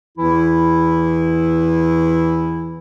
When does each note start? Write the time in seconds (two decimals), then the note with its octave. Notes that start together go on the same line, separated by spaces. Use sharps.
0.17 E2 E3 E4